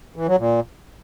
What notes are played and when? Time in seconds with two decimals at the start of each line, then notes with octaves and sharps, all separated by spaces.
0.16 E3
0.27 F#3
0.38 A#2